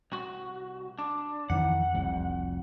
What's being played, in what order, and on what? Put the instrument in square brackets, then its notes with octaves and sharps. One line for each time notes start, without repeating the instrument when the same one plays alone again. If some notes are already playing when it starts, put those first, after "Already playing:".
[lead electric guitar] C2 F#4
D4
[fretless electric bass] F2 D#3 E3 [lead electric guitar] F#5
[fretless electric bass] F1 C2 F2